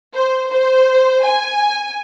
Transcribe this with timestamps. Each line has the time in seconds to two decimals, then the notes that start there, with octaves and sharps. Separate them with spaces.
0.14 C5
0.50 C5
1.24 G#5